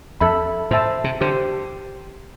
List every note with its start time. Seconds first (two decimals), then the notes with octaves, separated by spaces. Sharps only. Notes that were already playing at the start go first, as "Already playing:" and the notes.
0.21 F2 A4 E5 B5
0.71 A2 C5 E5 A5
1.04 C3
1.21 D3 G4 C5